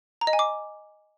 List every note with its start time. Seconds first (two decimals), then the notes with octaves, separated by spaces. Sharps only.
0.21 A#5
0.27 D#5
0.33 G#5
0.39 D6